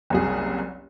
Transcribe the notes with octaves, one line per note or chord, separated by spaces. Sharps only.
F#1 C2 G#4